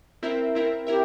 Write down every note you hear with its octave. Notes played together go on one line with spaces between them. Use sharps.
C4 E4 A#4 E5
C4 E4 A#4 E5
E4 G4 A#4 E5